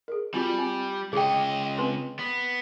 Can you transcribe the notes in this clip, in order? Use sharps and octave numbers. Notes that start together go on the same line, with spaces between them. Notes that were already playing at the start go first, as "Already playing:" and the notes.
G#4 A#4
G3 C4 F4 F#4
C4
C#2 G#4 D#5 G5
C4 B4 C6
B3